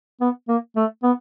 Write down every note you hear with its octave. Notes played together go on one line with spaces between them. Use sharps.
B3
A#3
A3
B3